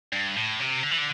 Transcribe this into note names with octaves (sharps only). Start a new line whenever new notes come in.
G2
A2
C3
D3
E3
D3